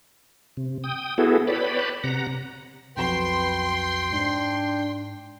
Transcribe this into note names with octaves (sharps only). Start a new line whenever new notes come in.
C3
G5 D#6
B3 E4 F#4 G#4 A4
B4 C#5 D5 G5 A5 B5
C3 F#5 A#5
B1 F2 F#4 B4 G5 C6
G#2 D4